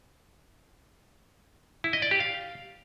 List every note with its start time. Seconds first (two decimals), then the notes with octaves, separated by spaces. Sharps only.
1.84 E4
1.93 D#5
2.02 D5
2.11 G4
2.20 F5